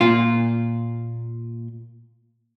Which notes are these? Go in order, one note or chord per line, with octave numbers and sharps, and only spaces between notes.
A#2 F4